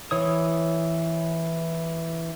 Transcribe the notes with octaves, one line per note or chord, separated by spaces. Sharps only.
E3 C#5 D#6